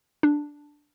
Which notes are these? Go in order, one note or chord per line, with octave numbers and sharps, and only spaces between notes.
D4